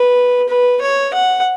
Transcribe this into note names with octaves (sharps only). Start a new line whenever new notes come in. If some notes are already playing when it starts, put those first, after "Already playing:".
Already playing: B4
B4
C#5
F#5